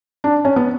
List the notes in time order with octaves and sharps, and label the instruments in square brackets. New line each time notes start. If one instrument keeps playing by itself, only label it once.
[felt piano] D4
C#4
B3